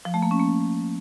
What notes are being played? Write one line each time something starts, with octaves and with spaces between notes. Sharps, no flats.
F3
A3
A#3
C#4
A#3